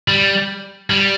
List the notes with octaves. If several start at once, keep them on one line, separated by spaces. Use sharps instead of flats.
G3
G3